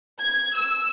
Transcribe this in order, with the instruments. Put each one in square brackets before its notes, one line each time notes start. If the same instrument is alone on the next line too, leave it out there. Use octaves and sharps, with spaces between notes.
[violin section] G#6
E6